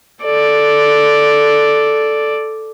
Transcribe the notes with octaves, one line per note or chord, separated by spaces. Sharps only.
A4 D5